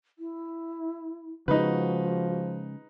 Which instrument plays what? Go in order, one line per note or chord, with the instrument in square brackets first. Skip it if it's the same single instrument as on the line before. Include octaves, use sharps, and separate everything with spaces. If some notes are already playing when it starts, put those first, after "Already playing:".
[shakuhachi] E4
[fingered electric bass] C#3 G#3 [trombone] F3 [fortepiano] D#4 B4 [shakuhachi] F#4